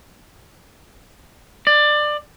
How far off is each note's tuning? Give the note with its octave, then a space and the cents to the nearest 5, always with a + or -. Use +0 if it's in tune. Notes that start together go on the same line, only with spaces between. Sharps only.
D5 +20